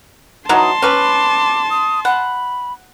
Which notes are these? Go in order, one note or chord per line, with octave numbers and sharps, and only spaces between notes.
E3 F#3 D#4 A5 C6 D#6
C#4 B4 D6
D#6
F#5 B5